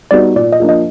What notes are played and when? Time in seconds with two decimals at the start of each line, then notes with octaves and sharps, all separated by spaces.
0.11 G3 B3 D#4 F#4 D5
0.36 A#2 D5
0.52 D#5
0.60 F3 A#3 D4
0.69 D#5